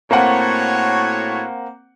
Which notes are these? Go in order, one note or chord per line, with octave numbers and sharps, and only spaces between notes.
A2 A#3 C4 F#4 C#5 F#5